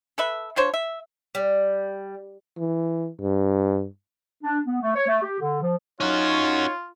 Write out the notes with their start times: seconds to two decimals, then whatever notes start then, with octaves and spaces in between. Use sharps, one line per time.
0.18 A4 B4 E5
0.56 F3 D4 C5 C#5
0.74 E5
1.35 G3
2.58 E3
3.20 G2
4.43 D4
4.66 B3
4.82 A3
4.95 C#5
5.07 A3
5.22 G4
5.40 D3
5.61 F3
6.01 C#4 D#4 F4 F#4 C#5